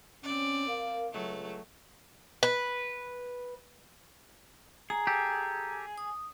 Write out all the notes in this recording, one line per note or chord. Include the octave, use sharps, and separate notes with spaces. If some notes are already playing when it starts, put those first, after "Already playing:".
C4 C#4 D5
A#4 F5
C#2 F#3 A3
B4
G#4 A#5
G4 A4
D#6